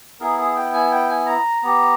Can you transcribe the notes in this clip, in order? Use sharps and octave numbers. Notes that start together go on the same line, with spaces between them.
B3 E4 G#4 A#4
G#4
G5
G#5
G5
G#5
A#5
B3 G4 A#5